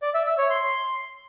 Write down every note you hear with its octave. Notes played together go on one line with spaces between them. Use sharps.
D5
E5
E5
C#5
C6